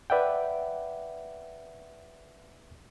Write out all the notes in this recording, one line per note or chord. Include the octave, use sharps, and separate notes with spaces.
B4 D5 E5 F#5 G5